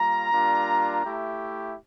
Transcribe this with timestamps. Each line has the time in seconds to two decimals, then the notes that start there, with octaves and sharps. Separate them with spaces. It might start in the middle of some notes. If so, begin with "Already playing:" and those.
Already playing: G3 A#3 F4 A#5
0.32 G3 A#3 D4 F4
1.05 A3 E4 G4